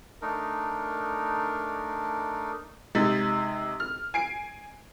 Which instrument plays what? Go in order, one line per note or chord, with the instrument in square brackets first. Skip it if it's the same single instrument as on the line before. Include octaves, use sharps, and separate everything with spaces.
[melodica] A3 D4 D#4 A#4
[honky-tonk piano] C3 G#3 D#4 A6 B6
F6
G#5 C7 D7